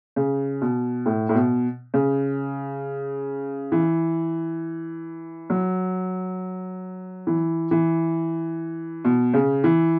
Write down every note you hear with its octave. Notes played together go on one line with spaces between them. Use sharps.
C#3
B2
A2
A2
B2
C#3
E3
F#3
E3
E3
B2
C#3
E3